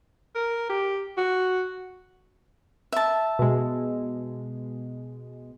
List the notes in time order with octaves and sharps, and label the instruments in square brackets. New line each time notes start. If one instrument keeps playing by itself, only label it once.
[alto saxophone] A#4
G4
F#4
[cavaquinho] E5 A5
[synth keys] B2 G#3